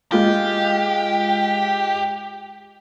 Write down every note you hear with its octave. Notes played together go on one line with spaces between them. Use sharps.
G#3 F4 G4